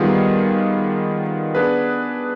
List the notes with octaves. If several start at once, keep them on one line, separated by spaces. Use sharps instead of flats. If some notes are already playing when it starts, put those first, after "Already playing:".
Already playing: D#3 G3 B3 F4 G#4
B3 D4 G#4 B4